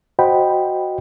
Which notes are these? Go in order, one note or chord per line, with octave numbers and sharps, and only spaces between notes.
F#4 C5 D#5 F#5 G5 B5